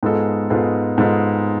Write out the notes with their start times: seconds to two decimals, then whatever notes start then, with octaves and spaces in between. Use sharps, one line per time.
0.03 G#2 G#3 B3 F4 A4
0.50 G#2 G#3 B3 F4 A4
0.98 G#2 G#3 B3 F4 A4